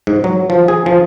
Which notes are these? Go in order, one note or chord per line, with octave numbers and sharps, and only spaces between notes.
G#2
F#3
F3
G#4
F3